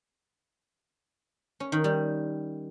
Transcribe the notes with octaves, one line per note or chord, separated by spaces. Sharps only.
C#4
D#3
G3